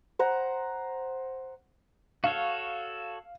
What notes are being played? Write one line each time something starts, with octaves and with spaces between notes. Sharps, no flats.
C5 F#5 A#5
F#4 A4 C#5 F5